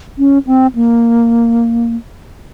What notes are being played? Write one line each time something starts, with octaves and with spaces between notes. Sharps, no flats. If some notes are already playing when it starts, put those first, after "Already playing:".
C#4
C4
A#3